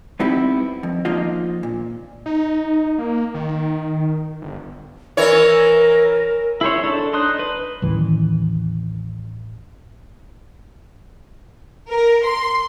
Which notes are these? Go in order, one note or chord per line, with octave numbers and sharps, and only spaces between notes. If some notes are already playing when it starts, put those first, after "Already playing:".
G3 B3 C4 D#4 E4 G4
F2
F3 A#3 D4 D#4 F4 D#5
A#2
D#4
A#3
D#3
G1
E3 E4 A#4 C#5
E4 G#4 C5 C#5
D4 A4 A5
D#4 C6 D#6 F#6
B4
A1 D#2 D#3 E3
A#4
C6